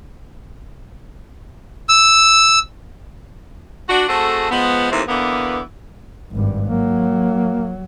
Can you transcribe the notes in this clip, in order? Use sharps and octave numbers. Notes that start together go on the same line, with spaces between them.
E6
D4 F#4
A3 C4 F#4 G#4 A4
F3 G#3 B3
D#2 A2 C3 E3 C4
D3 E3 A#3 B3
G#1 G2
F#3 A#3